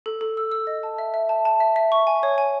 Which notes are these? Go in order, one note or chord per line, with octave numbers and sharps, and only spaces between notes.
A4
A4
E6
E6
D#5
A5
E5
E5
A5
A5
E5
E5
C#6
G#5
C#5
G#5